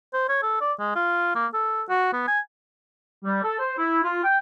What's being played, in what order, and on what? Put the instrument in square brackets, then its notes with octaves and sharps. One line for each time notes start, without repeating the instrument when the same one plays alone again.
[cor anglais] C5
C#5
A4
D5
G#3
F4
A#3
A4
F#4
B3
G#5
[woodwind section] G3
A4
C5
E4
F4
G5